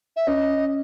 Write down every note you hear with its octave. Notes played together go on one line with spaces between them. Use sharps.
E5
C#4 D#5